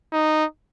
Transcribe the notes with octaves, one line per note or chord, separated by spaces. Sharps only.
D#4